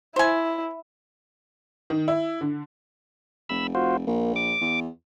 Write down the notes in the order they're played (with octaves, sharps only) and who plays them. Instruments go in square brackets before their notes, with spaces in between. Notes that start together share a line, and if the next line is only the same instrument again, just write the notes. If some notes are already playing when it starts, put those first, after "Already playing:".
[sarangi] E4 [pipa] C5 G#5
[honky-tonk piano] D#3
E4
D3
[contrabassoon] F1 [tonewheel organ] B5 E6
[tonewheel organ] F4 F#4 C5
[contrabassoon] A#1 [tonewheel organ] A#3
[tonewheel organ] D6
[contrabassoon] E2